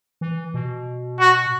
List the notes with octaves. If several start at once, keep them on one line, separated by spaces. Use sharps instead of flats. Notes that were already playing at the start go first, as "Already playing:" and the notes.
E3
B2
F#4